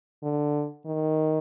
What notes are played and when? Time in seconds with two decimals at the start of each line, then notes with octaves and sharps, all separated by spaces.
0.23 D3
0.86 D#3